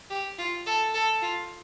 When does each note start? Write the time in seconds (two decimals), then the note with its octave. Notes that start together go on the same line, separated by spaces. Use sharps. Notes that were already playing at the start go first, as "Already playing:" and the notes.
0.10 G4
0.39 F4
0.67 A4
0.94 A4
1.22 F4